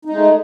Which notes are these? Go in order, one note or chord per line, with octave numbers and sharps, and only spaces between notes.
G#3 A3 D#4